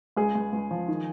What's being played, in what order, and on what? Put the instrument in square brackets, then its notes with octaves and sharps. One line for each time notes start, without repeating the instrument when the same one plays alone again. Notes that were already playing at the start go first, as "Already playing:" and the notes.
[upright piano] C#2 G#4
C#2
C#2
F3
D#3